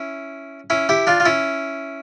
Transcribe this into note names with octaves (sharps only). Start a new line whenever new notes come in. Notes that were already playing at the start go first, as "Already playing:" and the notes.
Already playing: C#4 E4
C#4 E4
E4 G4
D4 F4
F4
C#4 E4